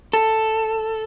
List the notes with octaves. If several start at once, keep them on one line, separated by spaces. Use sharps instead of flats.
A4